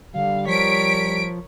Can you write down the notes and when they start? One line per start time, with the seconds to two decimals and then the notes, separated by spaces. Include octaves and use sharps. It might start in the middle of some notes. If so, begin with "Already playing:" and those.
0.16 D3 G3 F5
0.48 F3 A#4 C#5 B6 D7